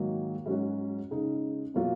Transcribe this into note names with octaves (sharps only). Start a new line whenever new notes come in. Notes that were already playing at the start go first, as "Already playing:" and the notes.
Already playing: G#2 D#3 F#3 A#3
G#2 F#3 C#4 F#4
C#3 G#3 D#4
B2 F#3 A#3 F4